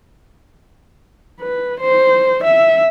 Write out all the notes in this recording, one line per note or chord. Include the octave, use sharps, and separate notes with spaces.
B4
C5
E5